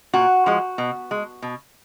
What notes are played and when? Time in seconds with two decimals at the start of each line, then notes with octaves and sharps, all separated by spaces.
0.13 A#2 F#4
0.46 F3 G#3
0.78 B2
1.11 G#3
1.42 B2